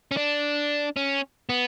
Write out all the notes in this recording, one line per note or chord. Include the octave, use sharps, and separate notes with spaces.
C#4
D4
C#4
B3